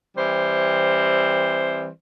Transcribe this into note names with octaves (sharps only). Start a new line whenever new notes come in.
E3 G3 C4 C5